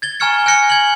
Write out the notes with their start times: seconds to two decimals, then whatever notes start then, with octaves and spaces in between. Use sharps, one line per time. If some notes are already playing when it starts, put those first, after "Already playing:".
0.02 G#6 A6 G7
0.20 G#5 A#5 C#6 F6 G#6 C#7
0.46 G#5 F#6 A#6 C#7 G7
0.70 G#6 F#7